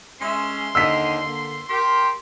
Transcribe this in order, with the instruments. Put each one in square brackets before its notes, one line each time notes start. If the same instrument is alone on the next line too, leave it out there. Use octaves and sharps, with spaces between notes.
[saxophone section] G#3 C#4 E5 [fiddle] C6
[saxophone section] D#2 D3 D#5 [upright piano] E6 B6
[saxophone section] D3 A#3
[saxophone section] G4 A#4 [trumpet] C6